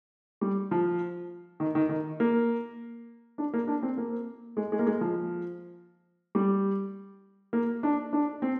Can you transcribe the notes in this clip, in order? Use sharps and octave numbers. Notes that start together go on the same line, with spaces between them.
G3
F3
D#3
D#3
D#3
A#3
D4
A#3
D4
C4
A#3
G#3
G#3
A#3
G#3
F3
G3
A#3
D4
D4
C4